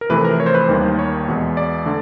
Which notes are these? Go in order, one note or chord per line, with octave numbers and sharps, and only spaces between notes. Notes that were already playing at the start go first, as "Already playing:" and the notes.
A#4
F2 C3 E3 A3 B4
A#4
C#5
C5
B4
C5
D#2 D#3 G3 A#3
C#5
E2 B2 G#3
D5
D3 A3